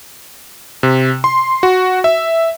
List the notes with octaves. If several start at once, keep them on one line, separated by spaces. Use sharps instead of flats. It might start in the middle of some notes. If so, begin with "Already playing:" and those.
C3
C6
F#4
E5